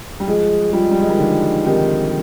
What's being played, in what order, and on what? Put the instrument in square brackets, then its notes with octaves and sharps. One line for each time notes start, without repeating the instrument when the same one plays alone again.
[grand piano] G3
[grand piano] F3 G#3 [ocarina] G#4
[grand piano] G3 [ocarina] F4
[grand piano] G#3
G3
G#3
D#3 G3
[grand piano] D3 F3 [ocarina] D#4
[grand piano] C3 D#3 [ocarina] G4